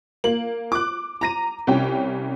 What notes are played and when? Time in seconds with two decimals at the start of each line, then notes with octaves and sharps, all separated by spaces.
0.24 A#3 F#7
0.72 D6 F#6
1.21 A#5 A#6 D#7
1.67 C2 C#4 G5